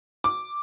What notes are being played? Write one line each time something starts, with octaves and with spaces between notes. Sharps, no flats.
D6